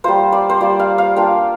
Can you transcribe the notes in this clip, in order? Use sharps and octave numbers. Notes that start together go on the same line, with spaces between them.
G3 A#3 F4 C5
D5
C5
G3 A#3 F4 D5
F5
F5
A#3 D4 F4 G5